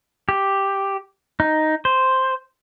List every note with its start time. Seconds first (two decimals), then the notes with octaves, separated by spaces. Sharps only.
0.29 G4
1.40 D#4
1.85 C5